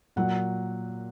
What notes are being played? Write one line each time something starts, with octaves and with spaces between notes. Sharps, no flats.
A#2 F#3 F#5